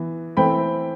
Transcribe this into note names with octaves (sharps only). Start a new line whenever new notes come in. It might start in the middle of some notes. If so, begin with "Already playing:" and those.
Already playing: E3 B3
E3 A3 C4 G5 B5